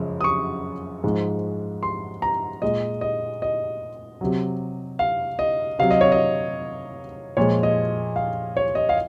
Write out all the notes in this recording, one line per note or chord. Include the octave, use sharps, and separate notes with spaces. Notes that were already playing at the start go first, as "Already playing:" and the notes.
Already playing: F#2 C#3 F3 G#3
D#6
C#6
G#2 F3 G#3
C6
A#5
A#2 G#3 D#5
D#5
D#5
C3 F#3
F5
D#5
C3 F#3 F5
D#5
C#5
D#5
A#2 F3 G#3 C#5
D#5
F5
C#5
D#5
F5